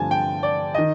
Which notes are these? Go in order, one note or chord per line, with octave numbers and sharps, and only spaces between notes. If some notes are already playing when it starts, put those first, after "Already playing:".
Already playing: G2 D3 F3 A3 C4 G#5 A5
G5
D5
D#3 D#5